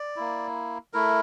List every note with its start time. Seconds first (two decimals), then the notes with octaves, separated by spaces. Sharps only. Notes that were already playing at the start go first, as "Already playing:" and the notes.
Already playing: D5
0.16 A#3 E4
0.93 A3 E4 A#4